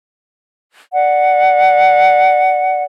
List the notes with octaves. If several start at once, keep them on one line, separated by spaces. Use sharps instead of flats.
D5 F#5